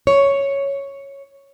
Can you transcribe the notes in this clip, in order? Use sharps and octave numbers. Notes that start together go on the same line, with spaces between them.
C#5